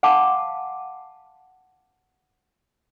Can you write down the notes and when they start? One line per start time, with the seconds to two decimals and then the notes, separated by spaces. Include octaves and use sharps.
0.03 F5 F#5 G#5 A5 C6 D6